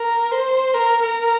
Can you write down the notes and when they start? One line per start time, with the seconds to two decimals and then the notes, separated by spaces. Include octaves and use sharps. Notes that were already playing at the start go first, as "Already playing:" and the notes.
Already playing: A#4
0.31 C5
0.74 A#4
1.02 A#4